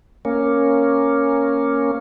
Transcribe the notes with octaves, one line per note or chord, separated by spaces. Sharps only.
A#3 C#4